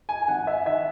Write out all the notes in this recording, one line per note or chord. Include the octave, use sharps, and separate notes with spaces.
G#5
G#5
G#1 F#5
E5
D#3 E5